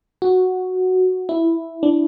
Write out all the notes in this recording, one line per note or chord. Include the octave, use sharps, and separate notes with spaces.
F#4
E4
D4